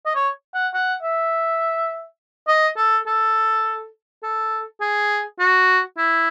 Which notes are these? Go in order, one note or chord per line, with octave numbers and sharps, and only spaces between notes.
D#5
C#5
F#5
F#5
E5
D#5
A4
A4
A4
G#4
F#4
E4